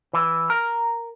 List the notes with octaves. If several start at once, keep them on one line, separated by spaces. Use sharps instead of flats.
E3
A#4